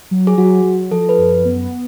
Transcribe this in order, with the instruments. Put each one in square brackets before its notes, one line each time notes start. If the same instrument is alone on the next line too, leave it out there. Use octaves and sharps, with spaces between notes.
[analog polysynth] F#3
[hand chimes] G#4
[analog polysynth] F#3 [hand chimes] F#4
[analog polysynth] F#3
[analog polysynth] F3 [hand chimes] A4
[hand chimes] B4
[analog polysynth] F#2
B3